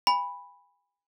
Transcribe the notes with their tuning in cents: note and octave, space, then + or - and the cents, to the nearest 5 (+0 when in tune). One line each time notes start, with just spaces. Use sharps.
G#5 -35 B5 +0